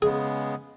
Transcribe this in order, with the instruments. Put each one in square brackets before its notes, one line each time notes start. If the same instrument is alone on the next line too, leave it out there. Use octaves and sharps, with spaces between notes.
[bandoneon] C#3 G#3 B3 [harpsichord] G#4